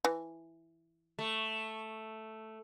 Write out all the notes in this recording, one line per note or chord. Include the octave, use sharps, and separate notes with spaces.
E3
A3